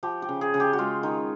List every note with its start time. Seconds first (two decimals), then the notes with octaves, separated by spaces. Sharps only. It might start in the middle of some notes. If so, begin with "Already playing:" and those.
0.03 F3 G4
0.22 G4
0.29 C#3
0.41 G#4
0.54 C#3
0.60 G4
0.73 F#4
0.78 G#3 F4
1.03 D#3